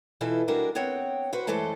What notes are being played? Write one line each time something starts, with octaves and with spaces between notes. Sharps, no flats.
B2 E3 E4 F4 A4
G3 G#3 D4 F#4 A#4
B3 C4 C#5 F#5 G5
F#4 B4 C5
F#2 E3 G#3 A3 A4 C5